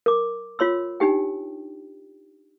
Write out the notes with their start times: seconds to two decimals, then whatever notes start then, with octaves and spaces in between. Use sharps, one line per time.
0.06 A#4 D6
0.59 F4 C#5 C6 E6
1.00 D4 D#4 G4 G5